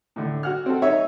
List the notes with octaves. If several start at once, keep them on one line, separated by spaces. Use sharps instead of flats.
A2 D3
F#4 F#5 F6
C4 F#4 A4
D#4 C#5 E5